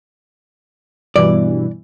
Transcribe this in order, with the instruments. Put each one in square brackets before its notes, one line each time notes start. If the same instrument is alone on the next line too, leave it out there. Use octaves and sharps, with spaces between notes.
[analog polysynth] G2 B2 E3 [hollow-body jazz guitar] D5